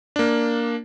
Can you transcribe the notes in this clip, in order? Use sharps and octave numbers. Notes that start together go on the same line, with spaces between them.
A#3 D4